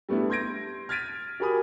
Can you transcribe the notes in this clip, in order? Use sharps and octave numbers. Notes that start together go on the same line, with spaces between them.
G3 A3 B3 D4 E4
C6 G6 G#6 A#6 D7
F6 G#6 A6 B6 D7 D#7
F#4 G4 A#4 G#5 B5 D#6